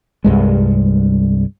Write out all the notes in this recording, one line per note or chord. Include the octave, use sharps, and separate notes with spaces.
C2 G2 G#3